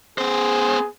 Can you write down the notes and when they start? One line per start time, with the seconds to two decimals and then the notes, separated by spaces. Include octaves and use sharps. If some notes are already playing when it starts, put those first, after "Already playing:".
0.18 B3 G#4 C5